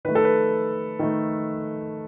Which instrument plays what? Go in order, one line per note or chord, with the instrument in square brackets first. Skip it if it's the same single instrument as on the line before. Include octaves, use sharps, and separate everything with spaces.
[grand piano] D#3 A3 B4
A4
B4
D#3 A3